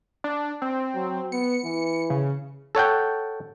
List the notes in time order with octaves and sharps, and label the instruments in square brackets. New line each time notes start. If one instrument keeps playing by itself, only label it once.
[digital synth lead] D4
C4
[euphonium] F#3
[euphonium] B3 [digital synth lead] C#7
[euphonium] E3
[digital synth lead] C#3
[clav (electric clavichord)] A4 C#5 F#5 G5